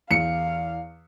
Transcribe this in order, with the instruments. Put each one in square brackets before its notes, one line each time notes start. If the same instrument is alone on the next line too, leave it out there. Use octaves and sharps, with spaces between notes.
[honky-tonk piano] E2 [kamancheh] F5 [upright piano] C#7